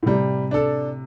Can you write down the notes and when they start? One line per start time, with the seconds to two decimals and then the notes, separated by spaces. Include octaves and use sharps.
0.03 A2
0.06 C3 G3
0.51 D4 A4